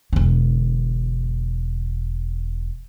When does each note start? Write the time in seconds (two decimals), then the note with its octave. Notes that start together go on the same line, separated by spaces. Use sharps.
0.13 E1 D3